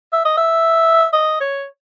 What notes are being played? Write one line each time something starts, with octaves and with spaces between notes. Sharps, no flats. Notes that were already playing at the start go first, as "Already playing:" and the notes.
E5
D#5
E5
D#5
C#5